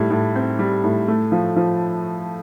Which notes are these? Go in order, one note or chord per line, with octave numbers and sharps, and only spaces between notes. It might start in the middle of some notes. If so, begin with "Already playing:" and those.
Already playing: A2 G3
A2
C4
G3
A2
A3
F3
F3